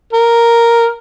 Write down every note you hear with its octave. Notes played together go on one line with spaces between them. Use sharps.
A#4